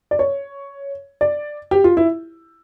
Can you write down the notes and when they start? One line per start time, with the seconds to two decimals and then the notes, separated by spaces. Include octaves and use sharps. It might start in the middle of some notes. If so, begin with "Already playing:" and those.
0.11 D5
0.19 C#5
1.21 D5
1.71 G4
1.84 F4
1.97 E4